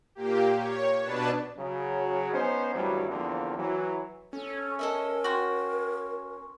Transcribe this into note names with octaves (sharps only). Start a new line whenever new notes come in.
A#2 A#3 G4
C#5
B2 D4 B4 A5
C#3 F#3
B3 C#4 D#4 C5
D2 G2 E3 F#3 G3
E2 D3 F3 A#3 C4
E3 F#3
C#4 A4
A4 A#4 D#5 E5
F#4 G5 C6 C#6